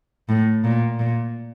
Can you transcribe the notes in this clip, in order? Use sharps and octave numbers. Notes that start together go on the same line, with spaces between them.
A2
A#2
A#2